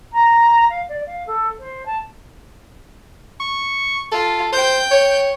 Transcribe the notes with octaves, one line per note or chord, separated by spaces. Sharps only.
A#5
F5
D5
F5
A4
C5
A5
C#6
F4 A4
C5 G5 G6
C#5